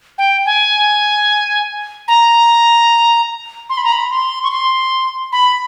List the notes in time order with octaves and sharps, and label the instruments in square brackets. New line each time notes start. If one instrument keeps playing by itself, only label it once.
[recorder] G5
G#5
A#5
C6
B5
A#5
B5
C6
C#6
C6
B5